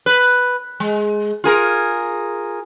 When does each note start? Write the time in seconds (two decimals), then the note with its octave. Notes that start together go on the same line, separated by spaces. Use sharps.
0.06 B4
0.80 G#3
1.44 F4 G#4 A#4